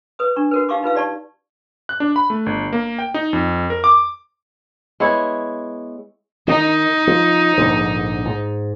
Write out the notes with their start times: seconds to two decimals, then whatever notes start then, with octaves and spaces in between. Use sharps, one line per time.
0.19 B4 D#6
0.36 D4 C#6
0.51 F#4 A#4 B4
0.69 D#4 G4 F5 C#6 D6
0.82 D#4 F4 B4 F5
0.95 G4 D5 A5 C#6
1.89 F#6
2.00 D4
2.16 B5
2.30 A3
2.46 G1
2.73 A#3
2.99 G5
3.14 D#4
3.33 F2
3.70 A#4
3.84 D6
5.00 G#3 B3 E4 C#5
6.48 D#3 D#4
7.07 F3
7.58 A#1 G#2 D3
8.25 G#2